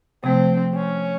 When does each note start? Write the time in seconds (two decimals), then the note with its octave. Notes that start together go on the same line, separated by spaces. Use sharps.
0.24 C3 F3 A3 C4
0.75 C#4